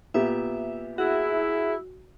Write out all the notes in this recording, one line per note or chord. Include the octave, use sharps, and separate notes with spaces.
A#2 B3 G4 E5
E4 F#4 G#4